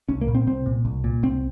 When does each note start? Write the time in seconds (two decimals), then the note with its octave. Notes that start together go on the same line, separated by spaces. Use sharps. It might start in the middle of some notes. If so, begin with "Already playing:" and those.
0.09 C2 C#4
0.21 A#3
0.28 A#2
0.35 C4
0.47 C2 C4
0.66 A#2
0.85 C2
1.04 A#2
1.23 C2 C4